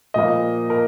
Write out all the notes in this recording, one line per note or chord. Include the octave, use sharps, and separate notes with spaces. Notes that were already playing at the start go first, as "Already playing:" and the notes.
A#2 F3 A#3 D#5
A#4